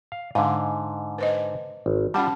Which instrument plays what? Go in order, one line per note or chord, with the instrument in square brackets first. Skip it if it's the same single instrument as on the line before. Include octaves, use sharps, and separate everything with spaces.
[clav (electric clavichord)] F5
[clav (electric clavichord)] G#2 D3 [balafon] F5
[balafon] B4 C5 D#5
[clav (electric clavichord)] G#1
[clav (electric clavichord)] G3 F4 [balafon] C#4 F#5 A5